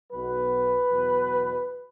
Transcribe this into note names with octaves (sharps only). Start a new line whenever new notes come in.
B1 B2 F#3 B4
E2 B2 F#3